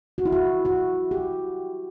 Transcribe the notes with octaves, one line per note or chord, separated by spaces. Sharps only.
F#4
E4
F#4
F#4
G4